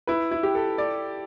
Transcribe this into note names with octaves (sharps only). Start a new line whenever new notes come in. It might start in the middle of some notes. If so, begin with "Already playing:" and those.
E4 B4
E4
G4
A4
D5